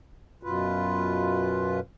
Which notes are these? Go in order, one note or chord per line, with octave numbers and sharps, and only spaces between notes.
F#2 B2 F4 B4